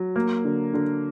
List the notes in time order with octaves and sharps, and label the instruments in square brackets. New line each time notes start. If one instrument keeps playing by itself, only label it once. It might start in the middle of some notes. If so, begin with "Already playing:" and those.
Already playing: [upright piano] F#3
A#3
D3
D3